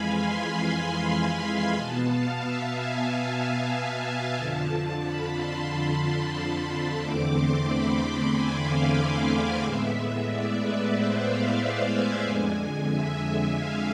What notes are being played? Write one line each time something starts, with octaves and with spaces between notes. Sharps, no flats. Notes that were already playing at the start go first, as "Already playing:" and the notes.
Already playing: F2 E3 G#3 F5 G#5 B5
C6
B2 B3 A5
F5
E5
G#5
G#5
A5
F2 D3 F3
B5
C6
E2 D3 A3 C4 D6
C6
B5
G#5
F5
G#5
A2 G#3 B3 E5
D5
B4
C5
F5
F5
G#5
F2 D3 G#3 G#5
E5
F5